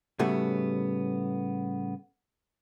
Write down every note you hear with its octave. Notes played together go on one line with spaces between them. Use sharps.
A2 C#3 G3 A3 B3 F#4